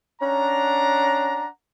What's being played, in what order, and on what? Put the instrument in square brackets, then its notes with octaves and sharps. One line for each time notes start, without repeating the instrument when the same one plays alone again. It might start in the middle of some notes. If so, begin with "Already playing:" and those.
[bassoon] C#4 [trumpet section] D4 F#5 A#5